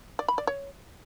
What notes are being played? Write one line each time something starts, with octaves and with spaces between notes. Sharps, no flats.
D5
B5
D5
C#5